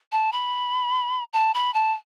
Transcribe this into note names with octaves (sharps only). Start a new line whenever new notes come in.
A5
B5
A5
B5
A5